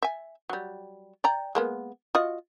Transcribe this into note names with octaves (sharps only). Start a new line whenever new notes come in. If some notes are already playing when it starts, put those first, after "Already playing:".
E5 G#5
F#3 G3
D5 G5 A#5
G#3 A#3 B3
F4 F#4 D#5